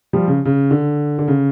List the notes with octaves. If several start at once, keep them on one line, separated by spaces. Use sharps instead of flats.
F3 G3
C#3
C#3
D3
D3
C#3